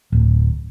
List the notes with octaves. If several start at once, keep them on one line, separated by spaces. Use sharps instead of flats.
D1